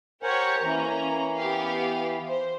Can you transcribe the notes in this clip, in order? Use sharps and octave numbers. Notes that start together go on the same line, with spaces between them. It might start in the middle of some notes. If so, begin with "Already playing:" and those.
G4 A#4 C5 C#5 F#5 G#5
E3 A#3 C#4 A#5
B3 G4 F5
C5